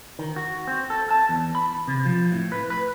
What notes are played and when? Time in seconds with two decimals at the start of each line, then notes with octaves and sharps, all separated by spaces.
0.19 D#3
0.36 F#4
0.67 C4
0.90 A4
1.11 A5
1.29 E2
1.55 B5
1.88 C3
2.05 F3
2.32 A2
2.52 B4
2.70 B4